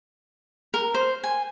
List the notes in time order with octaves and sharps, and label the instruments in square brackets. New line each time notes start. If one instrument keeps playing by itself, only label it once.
[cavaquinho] A#4
C5
G#5